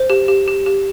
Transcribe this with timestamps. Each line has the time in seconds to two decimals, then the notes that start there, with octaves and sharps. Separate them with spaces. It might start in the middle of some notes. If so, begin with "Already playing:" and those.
Already playing: C5
0.10 G4
0.28 G4
0.48 G4
0.66 G4